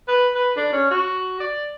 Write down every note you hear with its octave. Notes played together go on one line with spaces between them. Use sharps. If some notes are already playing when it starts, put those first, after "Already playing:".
B4
B4
D4
C#4
F#4
D5